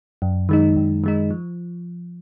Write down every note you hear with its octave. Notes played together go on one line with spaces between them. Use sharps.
F#2
D#3 G#3 D#4
F#2
D#3 G#3 D#4
F3